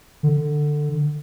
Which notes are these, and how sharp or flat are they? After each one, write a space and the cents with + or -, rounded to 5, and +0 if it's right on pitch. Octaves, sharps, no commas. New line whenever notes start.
D3 +15